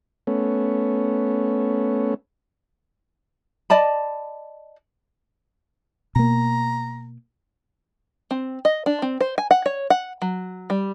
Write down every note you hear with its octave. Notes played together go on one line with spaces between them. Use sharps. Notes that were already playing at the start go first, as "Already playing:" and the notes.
A3 B3 C#4
D5 D#5 A5 B5
B2 A#3 A#5
C4
D#5
D4
C4
C5
G#5
F#5
C#5
F#5
F#3
G3